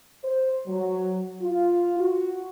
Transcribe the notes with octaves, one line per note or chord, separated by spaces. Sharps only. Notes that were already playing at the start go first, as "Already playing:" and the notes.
C5
F#3
F4
F#4